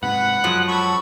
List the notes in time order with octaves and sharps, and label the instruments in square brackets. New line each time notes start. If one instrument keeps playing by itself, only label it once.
[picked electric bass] G#2 C3 [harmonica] B4 [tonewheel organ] F#5
[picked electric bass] F#2 [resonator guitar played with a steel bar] F3 F#3 G#3
[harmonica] A4 B5 C#6